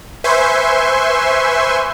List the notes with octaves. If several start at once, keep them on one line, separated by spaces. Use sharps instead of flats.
B4 C5 E5 G#5 C6 C#6